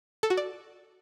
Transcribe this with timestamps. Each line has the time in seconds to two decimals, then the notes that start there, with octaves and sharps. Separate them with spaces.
0.23 A4
0.30 F#4
0.37 D5